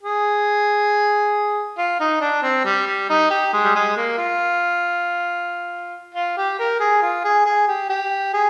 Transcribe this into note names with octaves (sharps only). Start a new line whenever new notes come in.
G#4
F4
D#4
D4
C4
G3
G3
D#4
G4
G#3
G3
G#3
A#3
F4
F4
G4
A#4
G#4
F4
G#4
G#4
G4
G4
G#4